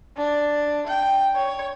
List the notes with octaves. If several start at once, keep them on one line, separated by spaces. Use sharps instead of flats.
D4
G5
C#5